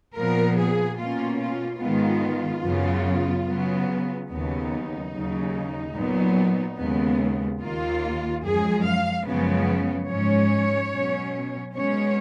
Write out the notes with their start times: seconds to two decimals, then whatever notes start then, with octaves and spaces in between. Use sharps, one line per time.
0.16 A#2 F3 B3 A#4
0.58 G#4
0.99 B2 A#3 C#4 F4
1.40 F4
1.81 G#2 D#3 G#3 B3 F4
2.65 F#2 C#3 F#3 B3
3.47 C#3 F#3 B3
4.30 D#2 C#3 F#3 B3 D#4
5.13 D#2 C#3 F#3
5.96 A#2 F#3 B3
6.78 D#2 C#3 G#3 B3
7.61 D#2 D#3 A#3 F4
8.44 F#2 F3 G#3 G#4
8.85 F5
9.26 F#2 C#3 F3 G#3 B3
10.09 G#2 F3 G#3 C#4 C#5
10.91 B2 F#3 C#4
11.75 B2 G#3 C#4 C#5